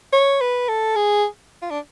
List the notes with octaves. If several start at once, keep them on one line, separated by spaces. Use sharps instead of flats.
C#5
B4
A4
G#4
F4
D4